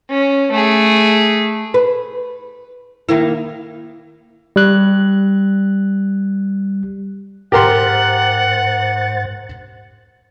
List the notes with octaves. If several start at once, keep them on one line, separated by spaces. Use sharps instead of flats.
C#4
A3 G#4
B4
D#3 A#3 E4
G3 F#6
G#2 G4 A#4 C5 F#5 C6 A6